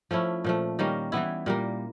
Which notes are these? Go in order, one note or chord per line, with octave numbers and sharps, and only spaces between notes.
F3 A3 C#4 E4
A#2 F3 A3
D#3 G3 A#3 C#4
E3 G3 B3 E4
A#2 G3 A#3